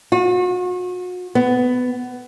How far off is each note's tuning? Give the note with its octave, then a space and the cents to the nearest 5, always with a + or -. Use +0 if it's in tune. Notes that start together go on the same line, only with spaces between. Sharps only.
F#4 -40
B3 +15